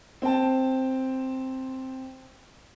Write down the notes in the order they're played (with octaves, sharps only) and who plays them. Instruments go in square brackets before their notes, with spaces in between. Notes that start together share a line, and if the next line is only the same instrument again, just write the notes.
[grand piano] C4 C5 G5 A5